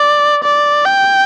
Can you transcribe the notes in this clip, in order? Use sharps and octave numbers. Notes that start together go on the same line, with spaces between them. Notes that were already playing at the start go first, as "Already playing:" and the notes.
Already playing: D5
D5
G5